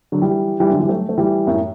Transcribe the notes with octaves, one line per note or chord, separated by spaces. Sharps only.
D3 F#3
E3 G3
E3 G3
D3 F#3
E3 G3
F#3 A3
A3
E3 G3
F#2 A2